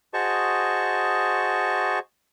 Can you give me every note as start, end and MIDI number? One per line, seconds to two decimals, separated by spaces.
0.14 1.99 66
0.14 1.99 68
0.14 1.99 72
0.14 1.99 75
0.14 1.99 81
0.14 1.99 85